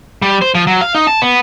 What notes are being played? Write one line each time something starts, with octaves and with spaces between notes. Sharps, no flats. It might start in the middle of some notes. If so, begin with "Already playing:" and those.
G3
C5
F3
F#3
F5
D#4
A5
B3